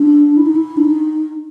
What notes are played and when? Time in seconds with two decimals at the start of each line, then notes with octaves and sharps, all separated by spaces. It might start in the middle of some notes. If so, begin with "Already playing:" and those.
Already playing: D4
0.37 E4
0.46 D#4
0.55 E4
0.77 D4
0.84 D#4